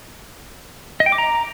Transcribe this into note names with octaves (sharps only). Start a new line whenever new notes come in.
D#5
G5
D6
A#5